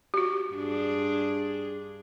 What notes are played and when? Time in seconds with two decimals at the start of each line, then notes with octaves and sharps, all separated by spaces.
0.14 F#4 G4
0.53 G2 D4 G#4